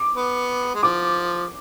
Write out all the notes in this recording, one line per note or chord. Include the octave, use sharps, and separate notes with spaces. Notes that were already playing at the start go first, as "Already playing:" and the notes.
Already playing: D6
B3
G#3
F3 D6